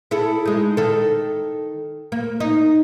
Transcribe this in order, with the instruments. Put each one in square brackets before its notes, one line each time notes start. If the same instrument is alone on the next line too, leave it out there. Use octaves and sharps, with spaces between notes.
[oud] E4 G#4 A4
G#3 D#4
D#3 A4
A#3
D#4